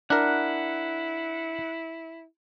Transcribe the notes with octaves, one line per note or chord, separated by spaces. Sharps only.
D4 E4 A#4 F#5